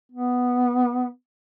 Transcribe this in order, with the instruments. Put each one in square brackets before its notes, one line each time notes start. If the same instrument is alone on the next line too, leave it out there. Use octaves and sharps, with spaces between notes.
[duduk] B3